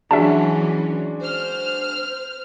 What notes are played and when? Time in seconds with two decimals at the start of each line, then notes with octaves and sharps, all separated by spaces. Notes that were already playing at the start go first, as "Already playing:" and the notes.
0.11 E3 F#3 G#3 C#4 D4 F#4 E5 A5
1.22 C5 F6